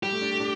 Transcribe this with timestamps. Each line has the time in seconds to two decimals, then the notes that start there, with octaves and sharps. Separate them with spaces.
0.03 G3 G4
0.12 A3
0.22 D4
0.31 A3
0.40 D4